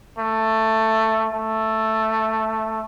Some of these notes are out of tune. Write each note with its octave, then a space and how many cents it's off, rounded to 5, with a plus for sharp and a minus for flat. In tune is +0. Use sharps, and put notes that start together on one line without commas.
A3 +10
A3 +5